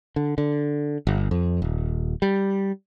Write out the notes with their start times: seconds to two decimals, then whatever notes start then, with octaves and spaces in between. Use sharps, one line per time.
0.16 D3
0.38 D3
1.07 G1
1.31 F2
1.62 D#1
2.22 G3